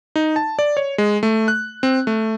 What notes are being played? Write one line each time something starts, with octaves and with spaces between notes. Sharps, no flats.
D#4
A5
D5
C#5
G#3
A3
F#6
C4
A3